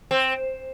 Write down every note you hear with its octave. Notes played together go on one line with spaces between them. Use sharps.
C4